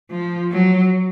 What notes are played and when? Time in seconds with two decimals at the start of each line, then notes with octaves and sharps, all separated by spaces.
0.10 F3
0.52 F#3